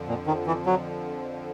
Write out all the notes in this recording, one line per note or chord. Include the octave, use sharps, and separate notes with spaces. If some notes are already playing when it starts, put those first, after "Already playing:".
Already playing: F2 D3 F3
A#2
D#3
E3
F#3